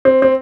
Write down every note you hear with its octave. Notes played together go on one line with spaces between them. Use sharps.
C4
C4